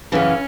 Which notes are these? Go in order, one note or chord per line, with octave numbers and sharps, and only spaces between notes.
F#2 C#3 E3 C#4